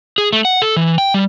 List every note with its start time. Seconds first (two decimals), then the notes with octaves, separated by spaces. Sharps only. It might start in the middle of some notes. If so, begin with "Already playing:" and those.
0.18 G#4
0.33 A3
0.45 F#5
0.62 A4
0.77 E3
0.98 G5
1.14 G3